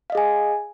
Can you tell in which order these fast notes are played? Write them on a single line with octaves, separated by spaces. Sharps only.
F5 D#5 G#4 G#5